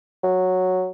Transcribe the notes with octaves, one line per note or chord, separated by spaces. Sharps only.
F#3